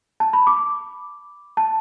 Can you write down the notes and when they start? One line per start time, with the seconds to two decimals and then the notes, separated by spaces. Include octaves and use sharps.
0.20 A5
0.33 B5
0.47 D6
1.57 A5